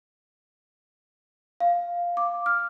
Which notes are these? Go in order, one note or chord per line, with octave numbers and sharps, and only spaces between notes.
F5
D6
F6